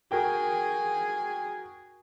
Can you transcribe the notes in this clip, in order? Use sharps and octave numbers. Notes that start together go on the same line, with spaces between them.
F#4 G#4 A#4 G5